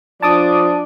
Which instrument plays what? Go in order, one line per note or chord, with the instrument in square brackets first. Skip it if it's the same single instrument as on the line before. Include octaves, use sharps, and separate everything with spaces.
[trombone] F3 [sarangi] D4 [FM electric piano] A5 D6 D#6